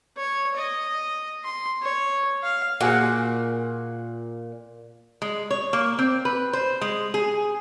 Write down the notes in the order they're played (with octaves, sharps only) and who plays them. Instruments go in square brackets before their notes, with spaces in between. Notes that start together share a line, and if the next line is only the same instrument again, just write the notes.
[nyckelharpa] C#5
D#5
C6
C#5
F5
[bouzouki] A#2 [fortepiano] F#4 G#4 F#5
[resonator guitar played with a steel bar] G#3
C#5
A#3
C4
B4
C5
G#3
G#4